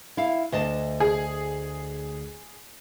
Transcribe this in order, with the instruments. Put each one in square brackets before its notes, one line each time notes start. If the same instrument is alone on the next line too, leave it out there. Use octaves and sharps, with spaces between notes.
[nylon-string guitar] E4 F5
D2 D#5 A5
[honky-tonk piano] G#4